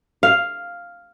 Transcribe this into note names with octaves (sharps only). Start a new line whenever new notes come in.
F5